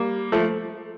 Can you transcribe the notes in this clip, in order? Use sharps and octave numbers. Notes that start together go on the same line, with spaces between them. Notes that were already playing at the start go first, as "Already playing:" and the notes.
Already playing: G3 A#3
F3 A3